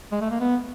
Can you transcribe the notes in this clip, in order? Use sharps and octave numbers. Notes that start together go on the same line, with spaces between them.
G#3
A3
A#3
B3